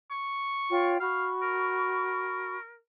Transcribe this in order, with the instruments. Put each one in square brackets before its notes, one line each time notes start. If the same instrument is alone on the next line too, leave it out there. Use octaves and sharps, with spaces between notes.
[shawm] C#6
[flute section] F4 C#5 G5
[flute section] F#4 B5 C#6 [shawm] F5
[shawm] A#4